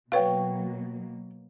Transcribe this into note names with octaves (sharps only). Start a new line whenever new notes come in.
B2 F#3 A#3 F#4 B4 C#5 F5 G5